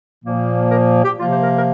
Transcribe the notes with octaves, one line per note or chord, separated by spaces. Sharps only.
A#2 F3 A#3
A#4
G4
C3 F3 A#3 F4
C5
A#4
A#4